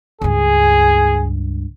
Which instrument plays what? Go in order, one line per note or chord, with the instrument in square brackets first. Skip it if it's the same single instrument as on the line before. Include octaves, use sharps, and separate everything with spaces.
[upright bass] C#2 G2 [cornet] G#4